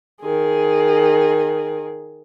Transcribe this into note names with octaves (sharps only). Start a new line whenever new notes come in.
D#3 G#4